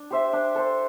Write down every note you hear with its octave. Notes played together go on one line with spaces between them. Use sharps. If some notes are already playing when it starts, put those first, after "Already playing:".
Already playing: D4
G4 C5 E5
D4
A4 C5